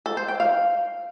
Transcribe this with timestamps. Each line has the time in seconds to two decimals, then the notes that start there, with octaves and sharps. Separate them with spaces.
0.06 A4
0.17 C5
0.28 G5
0.40 F5